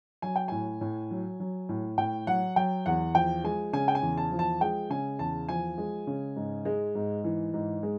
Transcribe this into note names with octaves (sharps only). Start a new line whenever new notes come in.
F#3 G#5
G5
A2 G#5
A2
F#3
F#3
A2
A2 G5
F#3 F#5
F#3 G5
E2 F#5
F3 G5
G#3 G#5
C#3 G#5
G5
G#5
E2
A5
F3
A5
G#3 G5
C#3 G#5
E2 A5
F3 G#5
G#3
C#3
G#2
G#3
G#2
E3
G#2
G#3